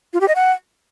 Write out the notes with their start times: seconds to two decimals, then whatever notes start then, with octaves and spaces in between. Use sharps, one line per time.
0.13 F4
0.21 G4
0.28 D#5
0.35 F#5